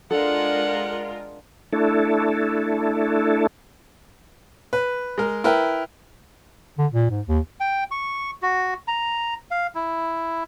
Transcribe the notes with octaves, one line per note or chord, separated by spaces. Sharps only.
G#3 D4 F4 A4 A#4 F#5
A3 D4 E4 A4
B4
G#3 A#4
E4 A#4 B4 G5
D3
A#2
G#2
D#2
G5
C#6
F#4
A#5
F5
E4